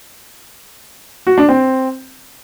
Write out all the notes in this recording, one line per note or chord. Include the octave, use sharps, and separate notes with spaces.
F#4
D4
C4